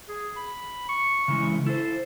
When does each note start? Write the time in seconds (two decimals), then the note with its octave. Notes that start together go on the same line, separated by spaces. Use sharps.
0.08 G#4
0.36 B5
0.89 C#6
1.28 C#3 E3 G#3
1.66 E4 A4 C5